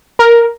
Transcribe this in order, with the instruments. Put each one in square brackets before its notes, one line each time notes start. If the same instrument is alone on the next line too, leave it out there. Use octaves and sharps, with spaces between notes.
[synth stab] A#4